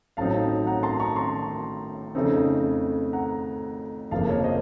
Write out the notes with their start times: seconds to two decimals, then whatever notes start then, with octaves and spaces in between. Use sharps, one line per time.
0.17 A1 A2 F#3 C4 D#4 F5 A5
0.67 F#5 A#5
0.83 A5 C6
1.00 A#5 C#6
1.16 A5 C6
2.15 F2 C#3 A3 C4 D#4
3.13 F#5 A#5
4.11 F#1 F2 C3 F3 A#3 F5 A5
4.27 C#5 F5
4.44 C5 D#5